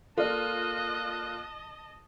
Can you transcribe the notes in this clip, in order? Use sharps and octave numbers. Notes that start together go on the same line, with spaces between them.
A#3 F4 A4 D5 D#5 A5 F#6